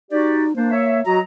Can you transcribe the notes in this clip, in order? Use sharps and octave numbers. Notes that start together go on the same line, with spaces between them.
D#4 F#4 G4 D5
A#3 D4 C5
C#5 E5
F#3 F#4 D#5 A#5